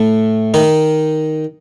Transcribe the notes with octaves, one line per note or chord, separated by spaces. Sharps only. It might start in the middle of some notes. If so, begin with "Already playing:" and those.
Already playing: A2 A3
D#3 D#4